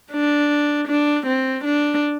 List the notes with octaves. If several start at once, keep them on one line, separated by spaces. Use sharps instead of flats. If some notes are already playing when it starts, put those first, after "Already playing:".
D4
D4
C4
D4